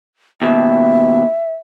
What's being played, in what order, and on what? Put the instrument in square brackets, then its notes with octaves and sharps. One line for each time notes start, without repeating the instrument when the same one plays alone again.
[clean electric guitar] D#2 B2 [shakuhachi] E5